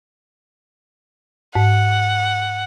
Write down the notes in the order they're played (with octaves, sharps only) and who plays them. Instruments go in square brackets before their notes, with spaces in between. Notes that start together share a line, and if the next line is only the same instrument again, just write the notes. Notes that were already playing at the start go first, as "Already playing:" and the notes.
[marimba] G#2 [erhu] F#5